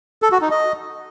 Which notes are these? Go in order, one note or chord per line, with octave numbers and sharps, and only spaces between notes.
A4
F#4
D#4
D#5